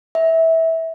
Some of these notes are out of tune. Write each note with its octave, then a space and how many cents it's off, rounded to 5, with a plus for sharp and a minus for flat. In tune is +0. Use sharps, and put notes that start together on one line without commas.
E5 -20